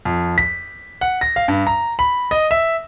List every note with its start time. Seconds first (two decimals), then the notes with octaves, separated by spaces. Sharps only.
0.05 F2
0.38 B6
1.01 F#5
1.21 A#6
1.36 F5
1.48 G2
1.67 A#5
1.99 B5
2.31 D#5
2.51 E5